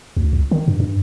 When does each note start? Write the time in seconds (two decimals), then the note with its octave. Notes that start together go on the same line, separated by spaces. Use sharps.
0.17 D2
0.33 C#2
0.51 D#3
0.68 G2
0.80 G2